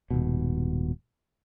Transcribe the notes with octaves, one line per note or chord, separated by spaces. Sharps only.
D#1 A#1 G#2 B2